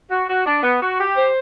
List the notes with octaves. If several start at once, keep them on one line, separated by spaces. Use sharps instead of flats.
F#4
F#4
D4
B3
F#4
G4
C5